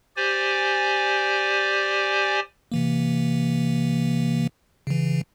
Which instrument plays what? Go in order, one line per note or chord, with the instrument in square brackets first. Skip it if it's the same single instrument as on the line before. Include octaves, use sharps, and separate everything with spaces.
[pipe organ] G4 C5 D5 G#5
[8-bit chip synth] C3 E3 A#3
C#3 E3